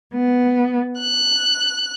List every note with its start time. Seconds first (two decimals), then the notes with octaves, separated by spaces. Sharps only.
0.13 B3
0.99 F#6